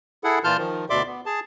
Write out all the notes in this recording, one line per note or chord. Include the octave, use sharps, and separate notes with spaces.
E4 G#4 A4 F#5
A#2 E3 F4 A5 F6 G6
D#3 F3
D2 B2 D5 E5 C6 D6
B3
G#4 A5